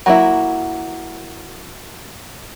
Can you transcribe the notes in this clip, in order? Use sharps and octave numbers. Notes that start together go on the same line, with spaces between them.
F#3 A#3 E4